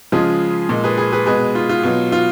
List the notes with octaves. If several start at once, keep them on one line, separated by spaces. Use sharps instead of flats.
C#3 F3 G#3 F4 G#4
A#2 G#3
G#4 B4
G#4 B4
G#4 B4
B2 G#3 G#4 B4
F4
F4
B2 F#3
F4